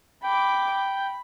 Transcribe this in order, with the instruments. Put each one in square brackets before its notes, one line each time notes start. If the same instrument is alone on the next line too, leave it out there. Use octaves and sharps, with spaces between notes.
[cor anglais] G5 [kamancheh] B5 D6
[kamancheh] B5